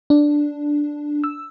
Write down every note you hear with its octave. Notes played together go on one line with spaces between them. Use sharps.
D4
E6